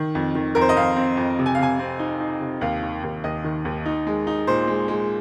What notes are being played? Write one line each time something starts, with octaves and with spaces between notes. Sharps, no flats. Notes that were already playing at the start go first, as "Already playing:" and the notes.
Already playing: D#3
F2
D#3
F2 A#4
C5
D#5
F2 F5
C4
F2
C3
G#5
F5
C3 G#5
C4
D#4
D#4
C3
D#2 F5
D#3
D#2
D#2 D#5
D#3
D#2
D#4
G#3
D#4
A#2 C5
G#3
G#3